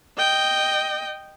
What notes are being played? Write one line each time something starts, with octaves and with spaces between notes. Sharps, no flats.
D#5 G5